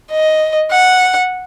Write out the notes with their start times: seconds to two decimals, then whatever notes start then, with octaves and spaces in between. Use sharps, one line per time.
0.11 D#5
0.71 F#5